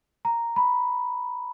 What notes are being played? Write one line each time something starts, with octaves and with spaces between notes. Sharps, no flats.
A#5
B5